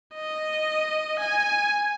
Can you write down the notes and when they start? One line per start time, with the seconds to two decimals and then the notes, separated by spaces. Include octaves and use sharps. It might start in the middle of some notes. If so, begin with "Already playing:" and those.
0.14 D#5
1.20 G#5